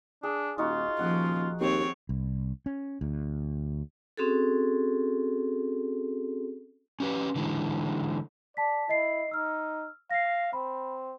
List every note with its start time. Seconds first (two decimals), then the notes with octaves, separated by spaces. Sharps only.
0.23 D4 G#4
0.58 D#1 D#4 F4 F#4
0.99 D#1 F3 F#5
1.61 D#2 C4 C#5
2.09 C2
2.66 C#4
3.01 D2
4.17 C4 C#4 F#4 G#4 A4
7.00 C#4 G4 B4
7.36 D3 E3 G#3
8.57 D5 A5 B6
8.89 E4 D#5 C7
9.31 D#4 E6 F6
10.10 F5 A#6 C7
10.53 C4 B5